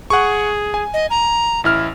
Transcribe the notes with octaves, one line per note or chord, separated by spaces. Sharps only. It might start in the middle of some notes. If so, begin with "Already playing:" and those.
G#4 F#5 C#6
G#5
D#5
A#5
A1 E4 F6